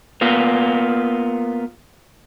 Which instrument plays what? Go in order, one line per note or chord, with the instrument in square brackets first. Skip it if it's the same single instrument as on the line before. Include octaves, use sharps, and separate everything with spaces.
[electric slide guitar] A#3 B3 F4